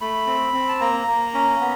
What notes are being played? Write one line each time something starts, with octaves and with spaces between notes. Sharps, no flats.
A3 B5
C4
C4
A5
A#3 A#5
A#3
C#4
B3